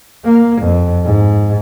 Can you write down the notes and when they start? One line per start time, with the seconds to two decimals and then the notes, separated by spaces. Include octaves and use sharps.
0.25 A#3
0.62 F2
1.05 G#2